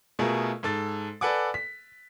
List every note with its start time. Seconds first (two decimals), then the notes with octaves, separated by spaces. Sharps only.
0.19 B2 A3 F4 G#4 A#4
0.63 G#2 A4 A6
1.21 A4 B4 D5 F#5 G#5 D6
1.54 B6